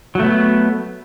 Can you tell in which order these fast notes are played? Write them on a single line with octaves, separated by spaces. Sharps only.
F#3 A3 B3